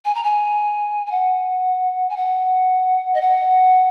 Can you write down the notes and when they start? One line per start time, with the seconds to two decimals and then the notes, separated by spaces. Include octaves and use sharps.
0.05 G#5
0.15 A#5
0.23 G#5
1.06 G#5
1.11 F#5
2.10 G#5
2.16 F#5
3.14 D#5
3.21 F#5